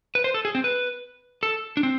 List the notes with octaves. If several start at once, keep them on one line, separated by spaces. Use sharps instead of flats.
B4
C5
A4
G#4
C4
B4
A4
D4
C4